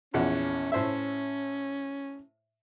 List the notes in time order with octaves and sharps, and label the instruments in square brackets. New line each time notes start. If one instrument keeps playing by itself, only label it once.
[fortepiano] A#1 E2 F#5 [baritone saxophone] C#4
[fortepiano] A2 C5 E5 [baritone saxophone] C#4